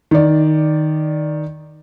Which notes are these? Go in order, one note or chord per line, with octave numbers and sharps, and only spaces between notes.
D#3 D5